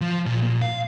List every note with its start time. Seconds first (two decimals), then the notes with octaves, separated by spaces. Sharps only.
0.01 F3
0.26 A#2
0.42 A#2
0.62 F5